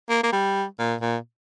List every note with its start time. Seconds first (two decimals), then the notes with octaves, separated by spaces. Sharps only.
0.09 A#3
0.23 A#3
0.33 G3
0.79 A#2
1.01 A#2